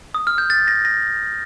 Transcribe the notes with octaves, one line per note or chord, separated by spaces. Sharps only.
D#6
F6
G6
A6
A#6
A#6